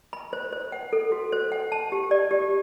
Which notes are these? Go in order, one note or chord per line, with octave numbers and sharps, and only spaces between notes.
B5
C5
C5
F#5
A4
F#4
C5
F#5
A5
G4
D5
G4